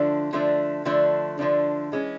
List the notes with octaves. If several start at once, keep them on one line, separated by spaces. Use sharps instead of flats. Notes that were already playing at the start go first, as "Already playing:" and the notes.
Already playing: D3 F3 A3 D4
D3 F3 A3 D4
D3 F3 A3 D4
D3 F3 A3 D4
E3 G#3 C#4